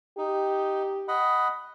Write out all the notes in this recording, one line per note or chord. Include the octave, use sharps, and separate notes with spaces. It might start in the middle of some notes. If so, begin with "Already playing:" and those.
D#4 G4
D#5 F#5 B5